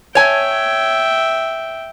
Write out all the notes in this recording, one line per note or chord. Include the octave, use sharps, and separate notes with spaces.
C#5 E5 G5 G#5